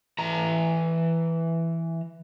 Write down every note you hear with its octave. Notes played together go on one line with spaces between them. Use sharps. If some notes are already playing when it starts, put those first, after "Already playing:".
E3 A#5